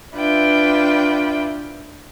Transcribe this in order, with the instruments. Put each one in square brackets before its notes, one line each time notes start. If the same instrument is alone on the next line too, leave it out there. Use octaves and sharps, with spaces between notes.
[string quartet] D4 E4 F4 B4 G5